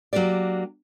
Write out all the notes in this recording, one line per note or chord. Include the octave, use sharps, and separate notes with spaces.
F#3 A#3 D4 G4 D5